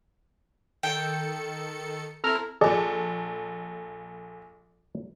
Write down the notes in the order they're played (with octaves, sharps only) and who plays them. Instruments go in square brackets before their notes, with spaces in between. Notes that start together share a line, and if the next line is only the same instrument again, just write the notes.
[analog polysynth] D#3 A4 C#7 [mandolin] G5
[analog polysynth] C4 E4 [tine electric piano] A4 A#5 F6
[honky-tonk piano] A#1 A4 [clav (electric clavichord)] G#4 D5 D#5